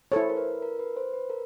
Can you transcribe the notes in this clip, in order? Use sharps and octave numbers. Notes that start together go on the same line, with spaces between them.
E4 A4 C5 C#5
A#4
B4
A#4
B4
C5
B4
A#4